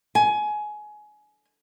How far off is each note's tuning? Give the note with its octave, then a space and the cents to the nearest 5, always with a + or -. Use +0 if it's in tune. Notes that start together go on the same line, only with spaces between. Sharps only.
G#5 +20